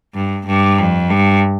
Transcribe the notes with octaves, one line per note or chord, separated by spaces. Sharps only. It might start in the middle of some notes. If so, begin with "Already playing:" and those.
G2
G2
F2
G2